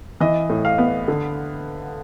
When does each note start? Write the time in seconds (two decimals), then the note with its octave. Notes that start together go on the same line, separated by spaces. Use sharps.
0.20 E3 D#5
0.50 A2
0.65 F5
0.78 B3
1.08 D3